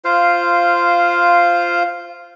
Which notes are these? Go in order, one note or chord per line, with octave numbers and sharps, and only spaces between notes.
F4 C5 F5